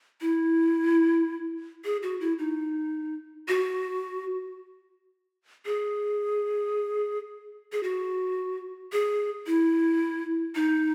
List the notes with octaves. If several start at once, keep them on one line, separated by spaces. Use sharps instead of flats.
E4
G#4
F#4
E4
D#4
F#4
G#4
G#4
F#4
G#4
E4
D#4